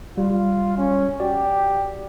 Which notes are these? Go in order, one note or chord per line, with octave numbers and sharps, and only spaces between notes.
G3 F4
C#4
F#4 G4 D5